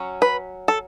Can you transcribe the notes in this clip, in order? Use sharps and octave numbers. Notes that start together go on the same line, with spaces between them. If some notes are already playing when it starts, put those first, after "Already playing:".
Already playing: F#3 C#4
B4
A4